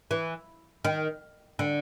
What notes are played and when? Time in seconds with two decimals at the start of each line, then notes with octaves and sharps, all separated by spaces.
0.11 E3
0.84 D#3
1.59 D3